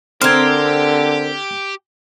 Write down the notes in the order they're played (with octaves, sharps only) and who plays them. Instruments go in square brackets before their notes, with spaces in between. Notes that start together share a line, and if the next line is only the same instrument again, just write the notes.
[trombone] D3 [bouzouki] C4 A#4 [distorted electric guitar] G4 [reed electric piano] F6 G#6